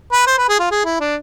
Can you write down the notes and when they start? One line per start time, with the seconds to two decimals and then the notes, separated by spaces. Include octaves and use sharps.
0.12 B4
0.27 C5
0.38 B4
0.49 G#4
0.59 F4
0.71 G#4
0.85 E4
1.00 D4